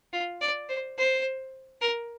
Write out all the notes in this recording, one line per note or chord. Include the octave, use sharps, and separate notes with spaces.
F4
D5
C5
C5
A#4